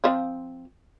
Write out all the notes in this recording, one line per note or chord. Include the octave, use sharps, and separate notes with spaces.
F3 C4 F4